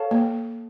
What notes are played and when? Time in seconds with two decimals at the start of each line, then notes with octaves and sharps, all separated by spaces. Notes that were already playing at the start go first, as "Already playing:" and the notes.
Already playing: A4 C#5 F5 A5
0.11 A#3